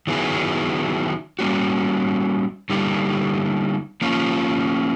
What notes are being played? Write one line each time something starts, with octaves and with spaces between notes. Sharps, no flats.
D#3 F#3 B3 E4 G#4
G3 A#3 C#4 F#4
D3 G3 A#3 D#4 G4
F3 A#3 C#4 F4